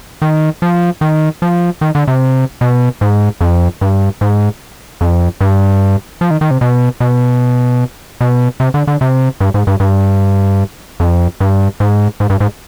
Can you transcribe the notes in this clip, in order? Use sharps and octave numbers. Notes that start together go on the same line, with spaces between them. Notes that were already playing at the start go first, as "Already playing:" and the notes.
D#3
F3
D#3
F3
D#3
D3
C3
B2
G#2
F2
G2
G#2
F2
G2
F3
D#3
D#3
C3
B2
B2
B2
C3
D3
D3
C3
G2
G#2
G2
G2
F2
G2
G#2
G#2
G2
G#2